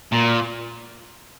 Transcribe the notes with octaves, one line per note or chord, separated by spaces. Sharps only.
A#2